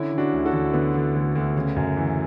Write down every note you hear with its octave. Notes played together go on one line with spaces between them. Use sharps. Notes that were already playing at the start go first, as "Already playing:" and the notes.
Already playing: D3 C#4 E4
D3
D4 F#4
D2
F#4 A4
D2
D3 B3
D3
D2
D2
C#3
F#2
E3